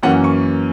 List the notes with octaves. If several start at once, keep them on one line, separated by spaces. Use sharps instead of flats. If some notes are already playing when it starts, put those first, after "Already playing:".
F#2 E3 A#3 C#4 F#5
C#6